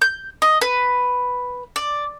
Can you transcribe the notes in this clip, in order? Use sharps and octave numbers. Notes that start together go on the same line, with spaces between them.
G6
D#5
B4
D5